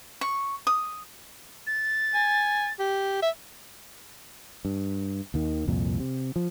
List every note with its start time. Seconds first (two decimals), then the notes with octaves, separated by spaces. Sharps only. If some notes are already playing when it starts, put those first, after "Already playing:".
0.21 C#6
0.67 D#6
1.67 A6
2.14 G#5
2.79 G4
3.22 E5
4.65 G2
5.34 D#2 D#3
5.67 C2 F2 A#2
6.00 C3
6.36 F3